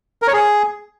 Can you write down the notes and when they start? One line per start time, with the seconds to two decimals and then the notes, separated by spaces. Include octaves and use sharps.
0.22 A#4
0.28 C#5
0.33 G#4